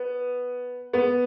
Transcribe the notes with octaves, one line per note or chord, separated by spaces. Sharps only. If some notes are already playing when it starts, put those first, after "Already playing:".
Already playing: B3
B3